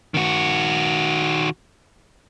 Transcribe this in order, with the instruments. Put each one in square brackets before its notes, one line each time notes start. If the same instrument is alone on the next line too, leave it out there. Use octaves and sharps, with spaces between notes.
[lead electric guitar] D#3 F#4